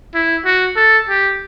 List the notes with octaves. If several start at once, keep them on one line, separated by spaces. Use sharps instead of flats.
E4
F#4
A4
G4